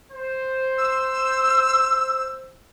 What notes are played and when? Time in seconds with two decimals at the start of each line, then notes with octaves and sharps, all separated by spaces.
0.11 C5
0.78 E6